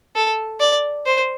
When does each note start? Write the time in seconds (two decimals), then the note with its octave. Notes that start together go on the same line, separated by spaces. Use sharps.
0.16 A4
0.60 D5
1.05 C5